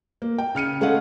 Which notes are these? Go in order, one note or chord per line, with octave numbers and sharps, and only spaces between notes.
A#3
G5
C#3 F6 C#7 D#7
G#3 A3 C#4 F5 F#5